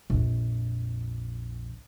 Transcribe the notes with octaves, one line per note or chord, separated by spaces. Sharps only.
A#1 F2